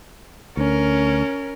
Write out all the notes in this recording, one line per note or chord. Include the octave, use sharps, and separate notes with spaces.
D2 C#4 A#4